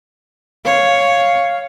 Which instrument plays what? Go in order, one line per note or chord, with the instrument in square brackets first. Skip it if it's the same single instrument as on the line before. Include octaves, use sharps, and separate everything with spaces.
[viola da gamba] C#5 [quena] F5